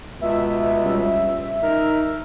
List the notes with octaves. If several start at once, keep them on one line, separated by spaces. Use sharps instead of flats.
C#2 B2 E5
G3 C#4 F4
D#4 A#4